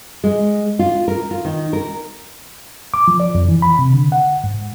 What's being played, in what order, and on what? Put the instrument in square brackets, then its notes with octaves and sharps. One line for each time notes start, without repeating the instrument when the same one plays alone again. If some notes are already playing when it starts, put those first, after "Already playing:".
[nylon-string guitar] G#3
F4
A#4
F4
D#3
A#4
[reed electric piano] D6
F3
D5
F2
E3
B5
C3
D3
F#5
G#2